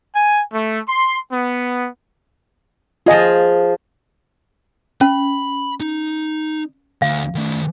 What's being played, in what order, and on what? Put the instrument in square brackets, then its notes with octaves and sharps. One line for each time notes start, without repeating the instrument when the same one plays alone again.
[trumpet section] G#5
A3
C6
B3
[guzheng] F3 G#4 [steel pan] F4 D#5 G#5
[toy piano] C#4 [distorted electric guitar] B5
[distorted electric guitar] D#4
[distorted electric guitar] D2 [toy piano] F5
[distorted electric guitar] D#3 A3